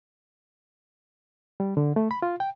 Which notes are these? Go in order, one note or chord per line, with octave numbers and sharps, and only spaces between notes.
G3
D3
A3
B5
F4
G5